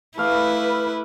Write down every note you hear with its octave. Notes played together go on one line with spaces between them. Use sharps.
A3 E4 B4 F5 D6